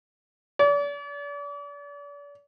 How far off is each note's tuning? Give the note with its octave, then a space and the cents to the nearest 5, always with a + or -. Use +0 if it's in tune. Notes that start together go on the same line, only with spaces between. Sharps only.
D5 -40